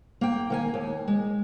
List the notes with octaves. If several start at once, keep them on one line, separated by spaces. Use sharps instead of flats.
A#3 G5
D#3 A#3 G#5
D#2
G#3